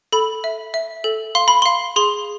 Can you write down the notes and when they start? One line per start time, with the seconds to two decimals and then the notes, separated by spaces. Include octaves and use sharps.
0.12 A4 B5
0.44 E5
0.74 E5
1.04 A4
1.35 F5 C6
1.48 B5
1.62 F5 C6
1.96 G#4 C6